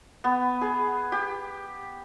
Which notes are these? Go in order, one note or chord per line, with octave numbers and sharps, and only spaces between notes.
B3
G#4
G4